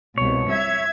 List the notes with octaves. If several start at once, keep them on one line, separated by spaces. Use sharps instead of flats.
C2 B2 C#5
E5 G#6